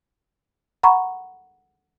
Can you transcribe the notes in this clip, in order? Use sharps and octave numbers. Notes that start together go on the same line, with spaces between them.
F#5 A#5 B5 C#6